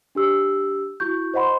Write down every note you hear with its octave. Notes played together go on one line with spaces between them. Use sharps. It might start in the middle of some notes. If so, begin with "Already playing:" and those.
D4 G4 E6
E4 F#4 C#6 G6
C5 D#5 F#5 B5 C6